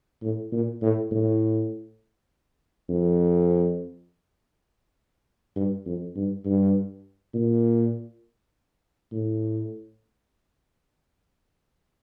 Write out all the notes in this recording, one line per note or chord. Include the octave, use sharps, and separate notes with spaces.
A2
A#2
A2
A2
F2
G2
F2
G2
G2
A#2
A2